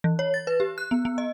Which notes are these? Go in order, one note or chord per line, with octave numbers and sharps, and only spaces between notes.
E3
C#5
A6
B4
G4
F#6
B3
B3
D#5